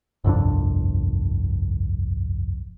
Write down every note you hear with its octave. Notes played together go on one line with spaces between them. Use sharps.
G1 C2 F2 D4